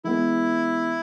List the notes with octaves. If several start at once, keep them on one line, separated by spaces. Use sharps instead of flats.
E3 G#3 B3 E4